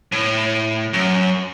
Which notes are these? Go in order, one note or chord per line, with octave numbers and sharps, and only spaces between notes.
A2
F#2